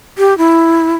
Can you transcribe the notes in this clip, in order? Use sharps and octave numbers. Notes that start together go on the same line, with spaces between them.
G4
E4